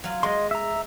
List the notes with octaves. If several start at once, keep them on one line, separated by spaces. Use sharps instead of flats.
F#3 F4
G#3 D#5 C6
E5 A#5